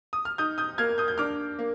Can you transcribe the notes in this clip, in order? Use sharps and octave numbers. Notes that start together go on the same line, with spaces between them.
D#6
F6
D#4 D#6 G6
D#6 G6
A#3 F6 G#6
D#6 G6
G6
D4 D6 F6
A#3